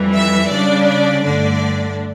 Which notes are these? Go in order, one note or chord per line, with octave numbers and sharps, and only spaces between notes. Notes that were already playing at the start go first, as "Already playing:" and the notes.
Already playing: F2 E3 G3
E5
C#3 G3 D4 D5
D5
G2 D3 A3 D4 D5